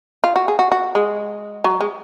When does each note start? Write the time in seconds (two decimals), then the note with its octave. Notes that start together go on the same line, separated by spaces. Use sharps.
0.24 F4
0.36 F#4
0.48 G#4
0.59 F#4
0.72 F#4
0.95 G#3
1.64 F#3
1.81 G#3